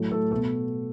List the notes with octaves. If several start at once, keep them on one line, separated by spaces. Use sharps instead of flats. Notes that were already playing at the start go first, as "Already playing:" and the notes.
Already playing: A2 F#3 A3
A3 A4
B2 A3 B3 A4